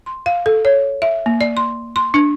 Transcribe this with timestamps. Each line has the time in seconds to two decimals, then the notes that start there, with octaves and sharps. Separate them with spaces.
0.06 C6
0.26 F5
0.46 A4
0.65 C#5
1.02 E5
1.26 A#3
1.41 D5
1.57 C6
1.96 C6
2.14 D4